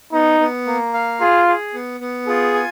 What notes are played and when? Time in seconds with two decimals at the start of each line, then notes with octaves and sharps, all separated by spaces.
0.13 B3 D#4
0.40 B3
0.66 A#3
0.94 F5
1.21 F4 G#4
1.47 G#4
1.74 B3
2.00 B3
2.28 F4 G#4
2.55 G#5